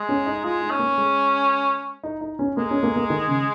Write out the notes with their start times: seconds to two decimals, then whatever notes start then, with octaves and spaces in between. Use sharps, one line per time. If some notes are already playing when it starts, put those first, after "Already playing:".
Already playing: G#3
0.09 C#4
0.26 D#4
0.44 G#3 F4
0.61 D#4
0.71 C#4
0.79 A#3
0.98 G#3
2.03 D#4
2.21 D#4
2.39 C#4
2.57 G#3 A#3
2.71 C#4
2.83 A#3
2.96 A#3
3.10 D#3
3.28 C#3